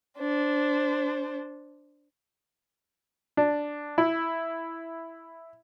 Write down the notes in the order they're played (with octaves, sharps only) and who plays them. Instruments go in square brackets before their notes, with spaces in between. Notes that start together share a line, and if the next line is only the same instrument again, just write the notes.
[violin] D4 C5
[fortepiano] D4
E4